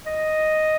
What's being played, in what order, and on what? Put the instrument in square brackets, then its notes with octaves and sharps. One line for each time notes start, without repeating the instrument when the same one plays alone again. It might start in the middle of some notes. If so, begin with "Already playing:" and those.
[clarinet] D#5